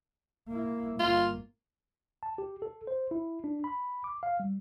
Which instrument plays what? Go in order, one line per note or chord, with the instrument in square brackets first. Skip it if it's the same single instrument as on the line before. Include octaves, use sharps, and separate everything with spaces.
[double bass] A#3 E4
[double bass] G1 A#3 [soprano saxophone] F4
[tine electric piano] A5
G4
A4
C5
E4
D4
B5
D6
F5
G3